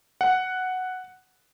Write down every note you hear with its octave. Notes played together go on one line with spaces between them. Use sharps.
F#5